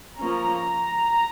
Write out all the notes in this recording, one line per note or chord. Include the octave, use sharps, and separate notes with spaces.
F3 A#3 C#4 A#5